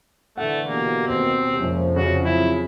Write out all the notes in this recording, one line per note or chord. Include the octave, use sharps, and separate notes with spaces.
D3 E3 A3 F#5
B2 A#3 G4
D#2 C4
F2 C3 F3 G#3 A#3 C#4
C#3 C#4 F#4 D5
F#3 C4 E4 F4